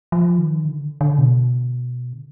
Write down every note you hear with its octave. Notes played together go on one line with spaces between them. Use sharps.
F3
D#3
D3
D3
B2
D3